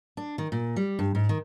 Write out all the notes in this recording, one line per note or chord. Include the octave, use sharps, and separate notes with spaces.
D4
D#3
A#2
G3
G2
G#2
D#3